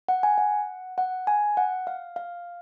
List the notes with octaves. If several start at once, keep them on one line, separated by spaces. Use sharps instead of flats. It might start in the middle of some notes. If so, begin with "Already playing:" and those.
F#5
G#5
F#5
F#5
G#5
F#5
F5
F5